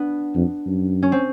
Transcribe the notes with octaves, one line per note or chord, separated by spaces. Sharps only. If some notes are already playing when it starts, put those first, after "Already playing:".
Already playing: B3 D4
F2
F#2
C#4
C4